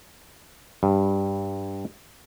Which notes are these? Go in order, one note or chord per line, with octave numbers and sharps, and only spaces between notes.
G2